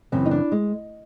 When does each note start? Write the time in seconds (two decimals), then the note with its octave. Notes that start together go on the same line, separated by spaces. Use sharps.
0.12 F#2 C#3 E3 C4
0.26 D#4
0.31 D4
0.52 G#3